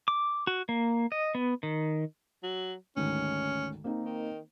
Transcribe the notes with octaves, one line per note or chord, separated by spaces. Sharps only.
D6
F#4
A#3
D#5
B3
D#3
F#3
D2 G#2 D#3 C#4
A#3 C4 D#4
D#3